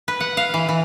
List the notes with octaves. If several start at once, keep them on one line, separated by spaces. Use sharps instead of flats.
B4
F#5
F5
E3
E3